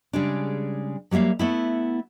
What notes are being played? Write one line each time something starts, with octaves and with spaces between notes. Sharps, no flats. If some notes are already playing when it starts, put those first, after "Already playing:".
C#3 G3 G#3 D4
F#3 G3 A#3 E5 F5
A3 B3 E4